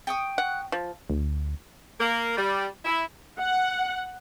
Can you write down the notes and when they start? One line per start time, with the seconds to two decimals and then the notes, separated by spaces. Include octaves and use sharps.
0.07 G5 C#6 D#6
0.38 F#5
0.72 F3
1.10 D2
1.99 A#3
2.37 G3
2.85 E4
3.39 F#5